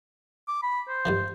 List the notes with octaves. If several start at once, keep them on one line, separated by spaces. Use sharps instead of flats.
D6
B5
C5
G2 D#3 E3